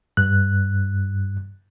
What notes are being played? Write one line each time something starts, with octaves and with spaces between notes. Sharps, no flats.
G2 F#6